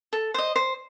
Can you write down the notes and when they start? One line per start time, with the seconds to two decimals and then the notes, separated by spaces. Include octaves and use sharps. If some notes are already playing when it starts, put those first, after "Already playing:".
0.13 A4
0.34 C5 D#5
0.56 C5